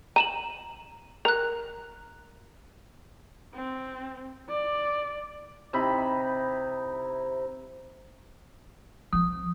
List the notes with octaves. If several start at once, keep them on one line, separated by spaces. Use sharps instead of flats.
A#5 D#7 E7 F#7
A#4 A#5 F#6
C4
D5
C3 D#4 E4 B5
F3 C4 D#6